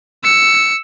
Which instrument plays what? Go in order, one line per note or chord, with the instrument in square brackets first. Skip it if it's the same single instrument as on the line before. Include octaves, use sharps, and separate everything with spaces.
[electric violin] E6 C#7